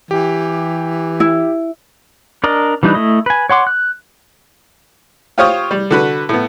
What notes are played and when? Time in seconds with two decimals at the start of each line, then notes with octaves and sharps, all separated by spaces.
0.11 E3 G4
1.20 E4
2.44 D4 A#4 D5 D#5
2.83 E3 G3 D4 D#4 B4
2.95 A3 E4 D#5
3.26 B4 G#5
3.50 C#5 F#5 C6 D6
3.67 F#6
5.38 F4 G4 C5 C#5 F5 D#6
5.71 G3
5.91 D3 F#4 B4
6.29 A2 B3